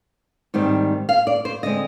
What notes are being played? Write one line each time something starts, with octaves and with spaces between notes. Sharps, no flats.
G#2 D#3 G3 C4
F5
D5
C5
D3 G#3 C4 D#5